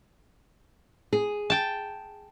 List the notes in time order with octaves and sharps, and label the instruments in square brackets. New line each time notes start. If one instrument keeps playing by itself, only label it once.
[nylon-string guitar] G#4
[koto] G5 A5